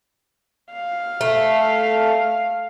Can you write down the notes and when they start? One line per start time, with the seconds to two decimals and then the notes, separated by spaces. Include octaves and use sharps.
0.73 F5
1.21 A3